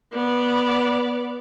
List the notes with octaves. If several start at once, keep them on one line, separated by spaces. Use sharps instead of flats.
B3 D5